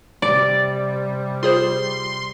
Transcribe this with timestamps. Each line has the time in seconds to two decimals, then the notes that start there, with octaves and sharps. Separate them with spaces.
0.22 C3 G3 D5
1.43 F4 G#4 C5 C6